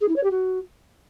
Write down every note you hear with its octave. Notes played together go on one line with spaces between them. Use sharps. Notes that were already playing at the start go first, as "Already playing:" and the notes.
G#4
E4
C#5
G4
F#4